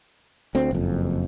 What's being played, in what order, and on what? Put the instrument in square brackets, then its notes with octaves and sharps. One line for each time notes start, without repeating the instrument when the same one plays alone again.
[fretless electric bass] D2 C4
F#1 F2